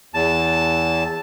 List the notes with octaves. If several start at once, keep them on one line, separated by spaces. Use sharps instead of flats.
E2 A5